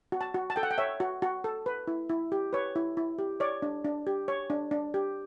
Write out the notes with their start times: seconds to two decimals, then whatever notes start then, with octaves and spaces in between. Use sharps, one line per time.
0.12 F#4
0.21 A5
0.34 F#4
0.50 A5
0.56 A4 G5
0.63 F#5
0.71 G5
0.78 C#5 E5
1.00 F#4
1.22 F#4
1.44 A4
1.66 B4
1.87 E4
2.09 E4
2.32 G4
2.53 B4 C#5
2.76 E4
2.97 E4
3.19 G4
3.40 C#5 D5
3.62 D4
3.85 D4
4.07 G4
4.28 C#5
4.50 D4
4.71 D4
4.94 G4